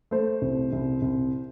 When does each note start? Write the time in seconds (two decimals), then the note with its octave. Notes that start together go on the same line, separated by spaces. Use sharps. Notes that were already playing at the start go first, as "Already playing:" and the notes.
0.11 A3 C5
0.42 C2
0.73 C2
1.02 C2